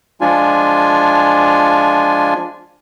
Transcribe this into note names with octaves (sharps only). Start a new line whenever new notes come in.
F3 G#3 D4 F4 G#5